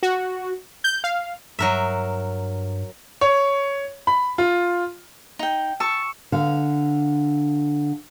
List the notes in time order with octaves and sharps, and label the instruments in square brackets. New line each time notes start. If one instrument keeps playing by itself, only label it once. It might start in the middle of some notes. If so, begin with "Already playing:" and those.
[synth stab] F#4
G6
F5
[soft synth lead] G2 [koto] F#3 A#4 E5
[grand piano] C#5
B5
F4
[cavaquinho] D#4 G5
[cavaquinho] A5 [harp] C#6 E6
[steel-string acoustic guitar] D3 F5